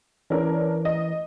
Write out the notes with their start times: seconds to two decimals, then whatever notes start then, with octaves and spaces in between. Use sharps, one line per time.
0.30 E3 C#4 D4 A#4
0.85 D#5